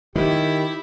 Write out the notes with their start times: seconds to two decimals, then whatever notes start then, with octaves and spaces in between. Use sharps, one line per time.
0.16 D#3 E4 G4